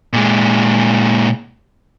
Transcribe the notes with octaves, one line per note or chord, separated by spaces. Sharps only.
A#2 G#3